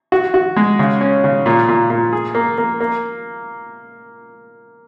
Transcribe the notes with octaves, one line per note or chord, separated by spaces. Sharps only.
F#4
F#4
G#3
C#3
C#4
C#3
A#2
A#2
A#2
G#4
A#3
A#3
A#3